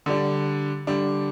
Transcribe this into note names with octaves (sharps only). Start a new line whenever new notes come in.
D3 G3 D4
D3 G3 D4